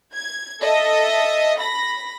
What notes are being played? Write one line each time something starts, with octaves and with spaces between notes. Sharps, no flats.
G#6
A4 D#5 E5
B5 A#6